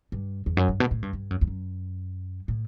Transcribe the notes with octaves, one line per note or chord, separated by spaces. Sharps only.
G2
E2
F#2
G2
B2
A2
G2
G2
F#2
E2
F#2
A2